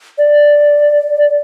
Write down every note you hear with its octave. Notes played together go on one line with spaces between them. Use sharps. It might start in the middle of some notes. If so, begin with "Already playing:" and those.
D5